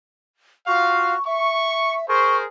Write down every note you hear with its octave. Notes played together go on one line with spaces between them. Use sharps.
F4 F#4 F5 C#6
E5 C#6
G#4 A#4 C5 C#6